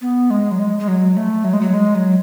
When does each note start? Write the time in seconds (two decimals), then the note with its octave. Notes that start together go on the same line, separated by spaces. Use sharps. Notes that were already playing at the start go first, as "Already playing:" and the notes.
0.02 B3
0.30 G#3
0.52 F#3
0.59 G#3
0.79 G#3
0.88 F#3
1.17 A3
1.44 F#3
1.53 G#3
1.61 F#3
1.74 G#3
1.95 F#3